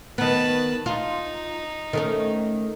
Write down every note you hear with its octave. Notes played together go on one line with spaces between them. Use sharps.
D#3 B3 B4 A5
D#4 F4
D#3 A3 C#4